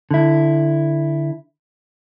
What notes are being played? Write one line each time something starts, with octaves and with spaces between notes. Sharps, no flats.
D3 E4